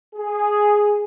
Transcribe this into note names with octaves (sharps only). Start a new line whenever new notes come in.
G#4